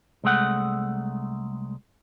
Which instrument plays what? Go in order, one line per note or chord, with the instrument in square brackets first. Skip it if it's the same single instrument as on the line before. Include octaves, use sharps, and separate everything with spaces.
[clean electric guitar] C2 G#3 A3 F#5